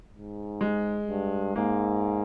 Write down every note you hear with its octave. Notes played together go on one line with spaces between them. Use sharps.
G#2
G#3
G2
G#2 A#3